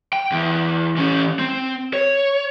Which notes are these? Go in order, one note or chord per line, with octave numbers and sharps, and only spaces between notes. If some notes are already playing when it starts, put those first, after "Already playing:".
G5
E2
E3 C#4
C4
C#5